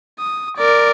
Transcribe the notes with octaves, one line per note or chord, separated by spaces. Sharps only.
D#6
A#4 D5